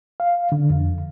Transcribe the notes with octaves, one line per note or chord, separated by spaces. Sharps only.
F5
D3
F2